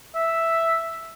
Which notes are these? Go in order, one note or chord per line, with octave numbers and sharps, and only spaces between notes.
E5